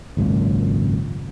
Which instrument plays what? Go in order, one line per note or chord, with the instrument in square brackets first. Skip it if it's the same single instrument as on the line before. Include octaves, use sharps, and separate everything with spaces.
[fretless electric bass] G#1 C#2 F#2 A#2